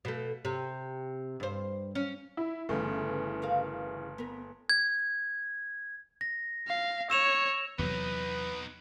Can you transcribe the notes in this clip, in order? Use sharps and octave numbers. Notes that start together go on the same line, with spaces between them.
B2 A3
C3
G2 C5
C#4
E4
G1 C#3 E3 A3
F#4 A#4 F5
B3 A#4
G#6
A#6
F5
C#5 E6 E7 F7
E2 C3 F#3 B3 D#4 B4